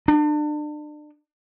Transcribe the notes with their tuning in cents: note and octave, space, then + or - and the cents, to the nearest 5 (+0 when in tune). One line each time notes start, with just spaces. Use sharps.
D4 +35